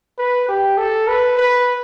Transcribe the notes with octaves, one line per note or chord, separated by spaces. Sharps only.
B4
G4
A4
B4
B4